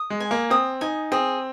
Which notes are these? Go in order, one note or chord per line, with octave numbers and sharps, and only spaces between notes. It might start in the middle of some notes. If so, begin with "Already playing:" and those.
Already playing: D#6
G#3
G#5
A#3
C4 D#6
D#4 G#5
C4 G#4